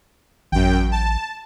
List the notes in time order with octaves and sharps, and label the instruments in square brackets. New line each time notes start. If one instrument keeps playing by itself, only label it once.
[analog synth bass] A1 [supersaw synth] F#2 G5
[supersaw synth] A5